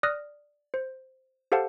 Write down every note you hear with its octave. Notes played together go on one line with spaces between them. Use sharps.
D5 D#6 F6 F#6 A#6
C5
G4 A4 C5 F5 F#5 A5